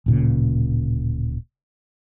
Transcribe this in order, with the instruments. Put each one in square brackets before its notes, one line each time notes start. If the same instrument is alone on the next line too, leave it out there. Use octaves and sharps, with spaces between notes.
[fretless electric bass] D1 A#2 C#3